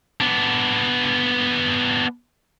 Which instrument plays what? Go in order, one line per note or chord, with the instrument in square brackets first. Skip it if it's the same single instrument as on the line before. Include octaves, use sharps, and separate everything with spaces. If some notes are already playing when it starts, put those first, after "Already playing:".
[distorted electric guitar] B3 D4